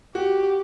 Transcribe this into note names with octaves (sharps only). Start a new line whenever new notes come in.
F#4 G4